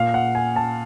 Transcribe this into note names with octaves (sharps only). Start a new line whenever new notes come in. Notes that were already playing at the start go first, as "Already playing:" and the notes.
Already playing: A#2 F5
F#5
G#5
A5